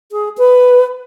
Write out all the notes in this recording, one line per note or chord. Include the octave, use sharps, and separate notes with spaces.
G#4
B4